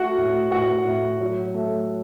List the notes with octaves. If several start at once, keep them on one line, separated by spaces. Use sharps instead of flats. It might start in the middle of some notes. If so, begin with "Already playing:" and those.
Already playing: A3 F#4 F#5
A2
A2 F#4 F#5
A2
F#3
A3